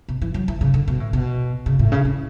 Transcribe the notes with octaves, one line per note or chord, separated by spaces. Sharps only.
B2
E3
F#3
E3
C#3
D3
B2
A2
B2
C#3
A2
C#3
E3